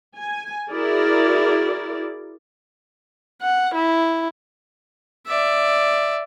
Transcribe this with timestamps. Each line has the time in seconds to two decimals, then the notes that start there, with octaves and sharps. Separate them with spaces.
0.16 G#5
0.71 E4 F#4 G#4 A#4 D5
3.41 F#5
3.74 E4
5.27 D5 E5